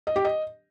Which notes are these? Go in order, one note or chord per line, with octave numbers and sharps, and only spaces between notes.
D#5
G4
D#5